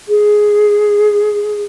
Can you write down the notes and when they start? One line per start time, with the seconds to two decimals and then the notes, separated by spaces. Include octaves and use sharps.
0.09 G#4